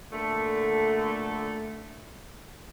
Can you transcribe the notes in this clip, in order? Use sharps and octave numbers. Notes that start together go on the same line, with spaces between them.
A#2 D3 A3